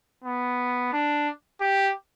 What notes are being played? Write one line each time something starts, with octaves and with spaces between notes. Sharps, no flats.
B3
D4
G4